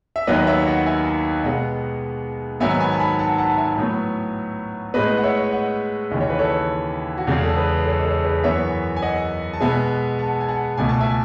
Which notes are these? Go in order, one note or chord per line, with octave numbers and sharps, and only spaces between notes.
E5
D#2 D#3 F#3 B3 B4 D#5
C#5 E5
D#5 F#5
E5 G#5
B2 G#3 B3 D#5 F#5
G#2 D#3 F#3 B3 E5 G#5
G#5 B5
A5
G#5 B5
F#5 A5
G#5
F#5 A5
A5
E5 G#5
A2 F#3 B3
A2 G#3 B3 B4 D#5
F#5
C#5 E5
D#5 F#5
D#2 C#3 E3 D#5
C#5
B4
A4 C#5
F#4
E2 C#3 G#3 G#4
A4
G#4 B4
A4 C#5
D#5
A4 C#5
G#4 B4
F#2 E3 B3 C#5 E5
G#5
D#5 F#5
A5
B2 G#3 B3 E5 G#5
F#5 A5
G#5
F#5 A5
C#2 B2 A3 G#5
A5
E5 G#5